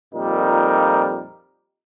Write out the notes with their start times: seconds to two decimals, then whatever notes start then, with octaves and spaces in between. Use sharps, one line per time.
0.14 F2 A#2 G3 D#4 A#4